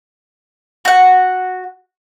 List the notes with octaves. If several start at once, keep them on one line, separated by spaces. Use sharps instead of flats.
F#4 F#5